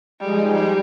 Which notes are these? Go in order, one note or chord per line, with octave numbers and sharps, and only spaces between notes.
F3 G3 G#3 D#4 G#4
G3